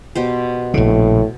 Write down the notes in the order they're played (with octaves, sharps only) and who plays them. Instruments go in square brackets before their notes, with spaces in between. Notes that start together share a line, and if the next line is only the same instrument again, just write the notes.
[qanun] B2 G4 C5
[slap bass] A#1 C#3 [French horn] A2